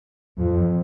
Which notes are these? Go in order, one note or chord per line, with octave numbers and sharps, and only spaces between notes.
F2